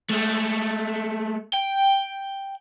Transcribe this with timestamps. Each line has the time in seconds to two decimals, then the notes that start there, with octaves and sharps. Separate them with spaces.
0.10 G#3 A3
1.54 G5